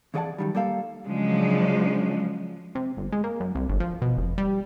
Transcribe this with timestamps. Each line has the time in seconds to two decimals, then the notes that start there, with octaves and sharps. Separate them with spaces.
0.14 F2 E3 G#4 D5 F#5 A5
0.38 F#2 D#3 G3
0.55 G3 A#3 A4 F5
1.07 C#3 F3 F#3 G#3 D4
2.75 C3
2.97 G1
3.12 G#3
3.24 A#3
3.40 F#2
3.55 C2
3.69 G1
3.80 F3
4.02 B2
4.18 F1
4.38 G3